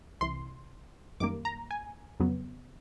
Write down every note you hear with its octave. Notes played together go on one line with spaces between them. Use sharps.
C2 C3 E3 C6
F#2 D#3 G3 A#3 D6
A#5
G#5
F2 C#3 F#3 B3